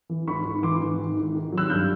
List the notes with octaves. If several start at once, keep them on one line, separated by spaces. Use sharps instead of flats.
E3
G#2 B5 C#6
G#2
E3 C6 D6
G#2
D#3
G#2
D#3
F#3
E6 F#6
G2 F6 G6